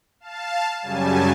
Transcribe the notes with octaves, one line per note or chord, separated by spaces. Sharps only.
F5 A5
F#2 C#3 F#3 G3 G#5 A5